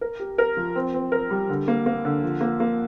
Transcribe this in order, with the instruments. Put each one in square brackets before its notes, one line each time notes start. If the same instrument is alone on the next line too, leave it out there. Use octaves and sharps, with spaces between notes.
[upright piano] A#4
G4
A#4
F3
C4
C4
A#4
G3
D3
A#3
A#3
D3
F3
A#3
A#3